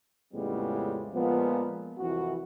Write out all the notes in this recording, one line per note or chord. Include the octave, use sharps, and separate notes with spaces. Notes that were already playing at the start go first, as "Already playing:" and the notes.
F2 A2 C#3 G3 G#3 B3
A#2 F3 G#3 B3
C2 F2 E3 F#4